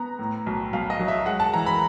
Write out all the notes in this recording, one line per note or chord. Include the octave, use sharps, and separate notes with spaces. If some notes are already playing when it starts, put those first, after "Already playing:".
Already playing: B3 A#5
A2
B1
B1 F5
D#5
F#3
E5
G#3 F#5
A5
E3 A#5
B5